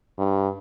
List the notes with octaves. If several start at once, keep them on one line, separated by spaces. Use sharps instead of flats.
G2